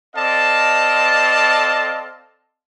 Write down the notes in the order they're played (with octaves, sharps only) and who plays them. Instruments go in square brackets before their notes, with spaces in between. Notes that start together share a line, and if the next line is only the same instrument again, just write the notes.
[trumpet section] C4 A4 D5 D#5 F5 A5